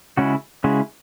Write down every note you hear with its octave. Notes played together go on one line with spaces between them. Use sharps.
C#3 G#3 C#4 E4 F#4
C#3 G#3 C#4 E4 F#4